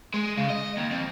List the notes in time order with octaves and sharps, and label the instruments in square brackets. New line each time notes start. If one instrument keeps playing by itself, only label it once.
[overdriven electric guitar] G#3
C#3
D#5
D#2
F2